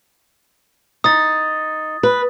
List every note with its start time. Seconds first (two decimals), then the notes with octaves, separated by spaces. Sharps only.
1.04 D#4 D#6 A6
2.03 B4